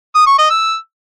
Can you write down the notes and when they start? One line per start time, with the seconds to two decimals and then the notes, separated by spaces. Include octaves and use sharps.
0.15 D#6
0.27 C#6
0.38 D#5
0.50 E6